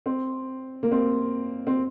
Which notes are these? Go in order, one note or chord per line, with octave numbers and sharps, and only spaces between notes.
C4
A#3
C4
C4